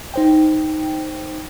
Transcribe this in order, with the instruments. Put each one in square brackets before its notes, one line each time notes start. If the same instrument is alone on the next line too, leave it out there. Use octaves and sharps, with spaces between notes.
[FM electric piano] D#4 C5 G5